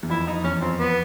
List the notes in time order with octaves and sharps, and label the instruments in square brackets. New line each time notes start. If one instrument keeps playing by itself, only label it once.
[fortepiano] E2
[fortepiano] F2 [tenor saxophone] E4
[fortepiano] F2 [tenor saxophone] D#4
[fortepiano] E2 [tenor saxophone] C#4
[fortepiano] F2 [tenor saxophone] C4
[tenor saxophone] B3